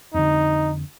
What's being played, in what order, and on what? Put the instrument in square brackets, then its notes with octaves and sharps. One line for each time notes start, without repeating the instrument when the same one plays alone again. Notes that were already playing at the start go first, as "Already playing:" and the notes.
[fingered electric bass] F2 D3 [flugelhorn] D#4